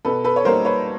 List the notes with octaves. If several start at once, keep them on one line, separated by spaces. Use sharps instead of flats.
B2 A4 B4
A4 B4
C#5
G3 A#3 D#4 A#4 C5
B4 C#5